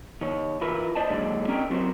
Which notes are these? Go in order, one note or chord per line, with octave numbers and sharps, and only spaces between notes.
D#3 C#5
E3 E4 F4 A#4 B4
C5 D5 D#5 A5
D#2 G#2 D3 F#3 G#3 D5
C4 C#4 D#4 A#4 D5 G5
F#3 G3 C4 F#4 A#4 C5